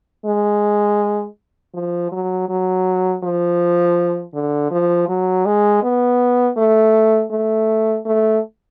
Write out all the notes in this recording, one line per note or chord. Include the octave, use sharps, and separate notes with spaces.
G#3
F3
F#3
F#3
F3
D3
F3
F#3
G#3
B3
A3
A3
A3